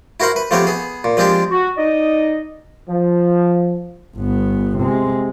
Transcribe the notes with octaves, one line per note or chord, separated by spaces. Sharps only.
E4 F#4 A#4 C5 F#5
B4
F3 A3 B3 C4 G4 C#5
B3 G#4
A#2
F3 G#3 C4 D4 G4
F#4
D#4 D5 D#5
F3
G1 B3
C3 G#3